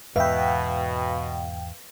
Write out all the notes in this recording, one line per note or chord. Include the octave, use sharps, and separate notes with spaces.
E2 G#2 B2 B4 E5 F5 G5